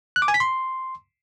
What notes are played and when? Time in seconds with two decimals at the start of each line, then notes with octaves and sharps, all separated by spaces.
0.16 F#6
0.22 D6
0.28 G#5
0.34 B6
0.40 C6